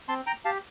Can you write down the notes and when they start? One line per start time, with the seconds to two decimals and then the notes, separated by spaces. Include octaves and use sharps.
0.08 C4 A5 C6
0.26 G5 A#5
0.45 G4 F5 A5